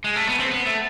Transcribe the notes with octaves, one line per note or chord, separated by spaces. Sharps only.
G#3
A3
B3
C4
B3
A3